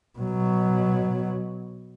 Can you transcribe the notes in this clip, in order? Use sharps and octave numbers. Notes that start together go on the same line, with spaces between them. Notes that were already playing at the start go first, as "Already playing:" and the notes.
B2 F#3